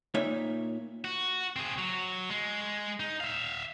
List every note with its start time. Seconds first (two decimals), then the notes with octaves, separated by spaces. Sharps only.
0.14 A#2 A#3 D#4 C#5 E5
1.04 F#4
1.56 C4 G#4
1.78 F#3
2.30 G#3
3.00 D#4
3.21 E5 F5